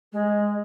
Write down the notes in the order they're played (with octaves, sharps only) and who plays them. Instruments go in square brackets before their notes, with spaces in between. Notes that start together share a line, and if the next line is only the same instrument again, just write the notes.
[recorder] G#3